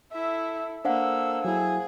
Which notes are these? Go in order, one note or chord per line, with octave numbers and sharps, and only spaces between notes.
E4 A4 E5
A#3 D4 A4 C5 F5 F#5 E6
F#3 E4 G#4